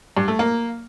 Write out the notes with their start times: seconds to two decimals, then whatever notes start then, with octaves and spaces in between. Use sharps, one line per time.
0.17 G2
0.28 A3
0.39 A#3